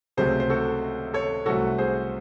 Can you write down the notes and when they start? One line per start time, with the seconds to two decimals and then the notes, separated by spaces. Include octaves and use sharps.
0.17 C#2 C3 F#3 A3 G#4 C5
0.40 C5
0.49 F#4 A4
1.14 A4 C#5
1.46 C2 C3 F#3 A3 F#4 A4
1.78 G#4 C5